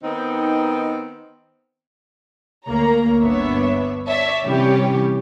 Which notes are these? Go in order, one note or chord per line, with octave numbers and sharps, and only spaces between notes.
D#3 B3 C4 D#4
D2 A#3 C#5 A#5
G1 B3 D4 C#5 E5
C#5 D5 E5 A5
C3 E3 G3 C#4 G4 C#5